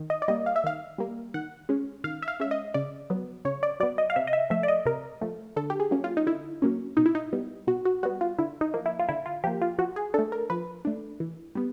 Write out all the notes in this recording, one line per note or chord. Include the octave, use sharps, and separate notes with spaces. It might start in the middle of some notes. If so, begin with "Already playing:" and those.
Already playing: D#3
D#5
D5
G3 A#3 D#5
F5
E5
D#3 F5
G3 A#3
D#3 F#5
G#3 C#4
D#3 F5
E5
F5
G#3 C#4 E5
D#5
C#3 D5
F#3 B3
C#3 C#5
D5
F#3 B3 D5
D#5
F5
C3 E5
D#5
E5
F3 A3 E5
D5
D#5
C3 A#4
F3 A3
D3 A4
G4
G#4
F#3 A#3 C#4
F4
D#4
D3 E4
F#3 A#3 C#4
B2 D#4
E4
D#4
G3 B3
B2 F#4
F#4
G3 B3 F#4
F4
D3 E4
D#4
F3 A#3
E4
F4
D3 E4
F4
F3 A#3 G4
F4
F3 F#4
G#4
A3 D4 A4
A#4
F3 B4
A3 D4
E3
G3 B3